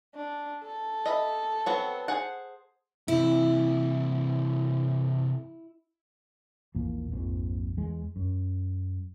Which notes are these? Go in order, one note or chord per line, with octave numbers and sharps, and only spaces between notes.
D4
A4
D#5 E5 B5
F#3 B3 C4
G#4 C5 F#5
C3 E3 E4
A#1 E2 A#2 A#3
A#1 F2 G#2
E2 G#3
F#2